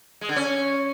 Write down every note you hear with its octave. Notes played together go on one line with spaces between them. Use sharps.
G#3
D3
C#4